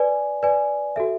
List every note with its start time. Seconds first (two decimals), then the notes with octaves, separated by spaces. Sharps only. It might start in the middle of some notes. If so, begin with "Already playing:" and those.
Already playing: B4 D5 G#5
0.43 B4 D5 G#5
0.96 F#4 A4 E5